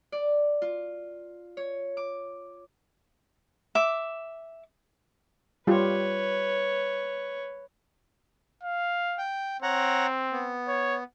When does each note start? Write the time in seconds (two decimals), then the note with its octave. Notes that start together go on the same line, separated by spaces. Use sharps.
0.12 D5
0.62 F4
1.57 C#5
1.97 D6
3.75 E5 D6
5.67 G3 F4 G4 B4 C#5
8.64 F5
9.18 G5
9.63 C4 C#5 F#5 A#5
10.32 B3
10.68 C#5